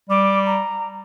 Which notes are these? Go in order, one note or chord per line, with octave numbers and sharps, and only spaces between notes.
G3 D6
A#5